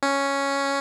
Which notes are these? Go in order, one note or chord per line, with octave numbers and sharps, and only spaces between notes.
C#4